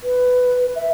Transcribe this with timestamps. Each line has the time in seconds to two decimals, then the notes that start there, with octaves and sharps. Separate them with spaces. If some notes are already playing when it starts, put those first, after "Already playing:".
0.03 B4
0.75 E5